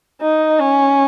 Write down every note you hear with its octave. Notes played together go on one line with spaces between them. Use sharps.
D#4
C#4